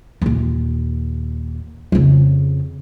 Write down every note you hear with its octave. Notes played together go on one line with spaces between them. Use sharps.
D#2 A#2
F2 C#3